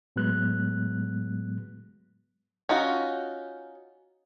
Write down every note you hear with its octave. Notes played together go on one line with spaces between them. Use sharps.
A2 F#3 G#3 B3 F#6
C#4 D#4 F4 F#4